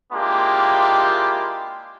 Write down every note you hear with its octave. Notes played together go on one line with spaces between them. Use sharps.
G#3 A#3 D4 E4 F4 G4